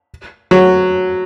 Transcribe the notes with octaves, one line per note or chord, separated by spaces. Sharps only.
F#3